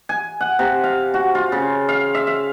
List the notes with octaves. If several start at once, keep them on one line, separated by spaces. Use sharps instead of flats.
G#5
F#5
C3
F5
F#4
F4
C#3
F5
E5
F5